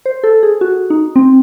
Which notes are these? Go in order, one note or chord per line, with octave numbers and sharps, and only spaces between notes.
C5
A4
G#4
F#4
D#4
C4